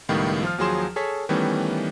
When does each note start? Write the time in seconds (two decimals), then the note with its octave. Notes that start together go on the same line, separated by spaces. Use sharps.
0.09 C#2 A2 D#3 G3 B3
0.43 F3 F4 F6
0.58 D#2 F3 F#3 G#4 C6 E7
0.96 G#4 A4 C#5 B6
1.29 D#3 E3 G3 A3 B3 C#4